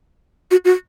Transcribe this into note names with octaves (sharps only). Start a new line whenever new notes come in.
F#4
F#4